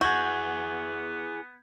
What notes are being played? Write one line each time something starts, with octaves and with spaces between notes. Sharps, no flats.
B3 E4 F#4 G#4 G6 G#6